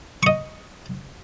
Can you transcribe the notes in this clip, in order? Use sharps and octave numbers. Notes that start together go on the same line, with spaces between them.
D#5 C#6